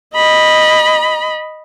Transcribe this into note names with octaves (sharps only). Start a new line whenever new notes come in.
D#5 B5